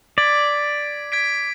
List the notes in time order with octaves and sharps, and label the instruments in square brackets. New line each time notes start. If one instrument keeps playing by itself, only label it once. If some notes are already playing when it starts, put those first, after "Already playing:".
[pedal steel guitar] D5 [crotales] G#6 B6 D7
[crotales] G#6 B6 D7